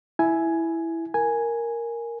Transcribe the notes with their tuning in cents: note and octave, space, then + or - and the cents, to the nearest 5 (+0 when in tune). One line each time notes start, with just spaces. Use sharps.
E4 +0 G#5 +10
A#4 +0 G#5 +0